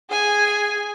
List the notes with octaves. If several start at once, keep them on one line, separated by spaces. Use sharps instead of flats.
G#4 G#5